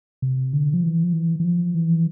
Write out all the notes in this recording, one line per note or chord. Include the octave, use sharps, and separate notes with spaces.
C3
D3
F3
E3
F3
E3
E3
F3
E3